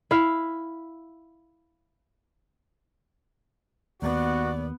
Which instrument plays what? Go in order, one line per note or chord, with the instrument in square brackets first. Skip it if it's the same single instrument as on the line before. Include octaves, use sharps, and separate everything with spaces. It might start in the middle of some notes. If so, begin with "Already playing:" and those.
[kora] E4 F5
[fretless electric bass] D#2 [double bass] B3 [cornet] F#4 [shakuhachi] D5